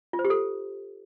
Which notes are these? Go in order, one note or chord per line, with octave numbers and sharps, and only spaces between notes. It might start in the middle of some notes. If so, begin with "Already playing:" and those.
F4
C5
G4
A4